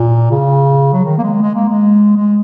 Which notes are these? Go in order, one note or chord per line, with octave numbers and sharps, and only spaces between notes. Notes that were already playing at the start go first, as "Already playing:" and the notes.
Already playing: A#2
C#3
F#3
D#3
A#3
G#3
G#3
A#3
G#3
G#3